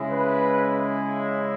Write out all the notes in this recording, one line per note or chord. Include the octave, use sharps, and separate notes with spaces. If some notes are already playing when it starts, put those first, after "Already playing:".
Already playing: C#3 G#3 E4
B4